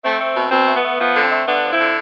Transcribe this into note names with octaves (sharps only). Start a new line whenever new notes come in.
A3 C4
A3
B2
B2 C4
A3
B3
A3
F3 B3
D3
C4
A3
D3 B3 D4
F3
C4 E4
D3